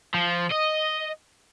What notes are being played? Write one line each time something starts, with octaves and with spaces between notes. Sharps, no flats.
F3
D#5